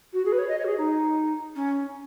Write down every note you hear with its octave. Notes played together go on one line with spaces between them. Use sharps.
F#4
G#4
B4
C#5
D#5
C#5
F#4
G#4
D#4
C#4